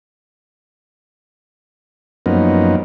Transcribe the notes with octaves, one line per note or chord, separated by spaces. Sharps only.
F#2 F3 A#3 B3 D#4